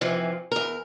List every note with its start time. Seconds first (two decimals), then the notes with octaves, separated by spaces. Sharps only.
0.01 G#2 C3 E3 F3
0.52 E2 A#4